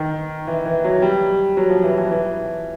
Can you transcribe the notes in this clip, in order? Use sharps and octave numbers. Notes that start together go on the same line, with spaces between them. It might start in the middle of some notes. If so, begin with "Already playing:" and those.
Already playing: D#3
E3
E3
F#3
G3
F#3
F3
E3
E3
E3